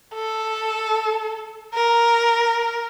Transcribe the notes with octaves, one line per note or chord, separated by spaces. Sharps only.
A4
A#4